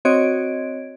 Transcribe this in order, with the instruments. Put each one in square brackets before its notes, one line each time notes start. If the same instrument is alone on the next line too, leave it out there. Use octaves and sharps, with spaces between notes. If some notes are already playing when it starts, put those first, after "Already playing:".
[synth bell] C4 F#4 C#5 D#5 G#6 D7